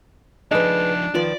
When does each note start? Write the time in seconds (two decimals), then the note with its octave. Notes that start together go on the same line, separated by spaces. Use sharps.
0.51 F3 D4 D#4 G#4 B4 D#5
1.15 D#3 F3 F4 B4 D5